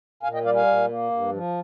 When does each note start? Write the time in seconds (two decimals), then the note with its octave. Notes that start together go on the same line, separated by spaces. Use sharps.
0.23 A#2 F5 G#5
0.34 D#5 G5
0.45 G3 D5 F5
0.56 F5 G#5
0.67 A#2
0.89 A#3
1.11 G2
1.32 F3